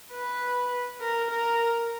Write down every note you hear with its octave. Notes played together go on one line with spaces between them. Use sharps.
B4
A#4
A#4